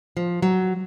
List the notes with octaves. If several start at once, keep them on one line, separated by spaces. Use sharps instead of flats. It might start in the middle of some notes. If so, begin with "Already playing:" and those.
F3
F#3